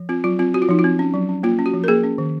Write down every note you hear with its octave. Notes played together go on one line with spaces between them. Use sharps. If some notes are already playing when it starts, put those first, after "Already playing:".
Already playing: F3
C4 F4
F#3 F4
C4 F4
C4 F#4
F4
F3 D#4
F4
C4
C#4
F#3
C#4
A#3 F4
C#4
F#4
F3
A#4
A#3 G#4
C#4
D#3